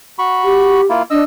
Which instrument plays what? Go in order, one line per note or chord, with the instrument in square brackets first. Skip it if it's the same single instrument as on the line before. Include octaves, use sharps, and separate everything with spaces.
[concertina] F#4 B5 C#6
[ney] G4
[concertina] A#3 E4 F4
[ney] D4 [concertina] D#5 E6